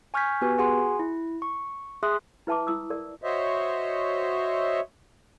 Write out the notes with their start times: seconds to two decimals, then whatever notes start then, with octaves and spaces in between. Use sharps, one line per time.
0.14 G#5 C#6 F6 G6 G#6 B6
0.41 B3 F#4 G4 B4 G#5
0.58 F#4 G#4 F#5 G#5 C6
0.99 E4
1.42 C#6
2.03 G#4 E5 C6 D#6 F#6
2.47 E4 B4 E5 A5 B5 D6
2.67 E4 D#6 E6
2.90 A#4 D5
3.22 F#4 C5 C#5 D#5 E5